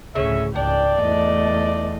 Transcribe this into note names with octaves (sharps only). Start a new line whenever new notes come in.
D2 A2 C#3 C#4 E5
C#2 G#2 D4 D5 G5
E2 A3 D#5